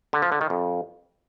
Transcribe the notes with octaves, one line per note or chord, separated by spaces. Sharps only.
D3
F3
D3
D#3
F2